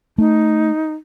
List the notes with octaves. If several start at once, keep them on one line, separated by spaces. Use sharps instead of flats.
A3 D#4